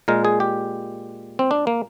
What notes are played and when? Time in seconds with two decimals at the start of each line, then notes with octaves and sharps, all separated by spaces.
0.08 A#2 G#3 A#4
0.25 G#4
0.40 G4
1.39 C4
1.51 D4
1.67 A#3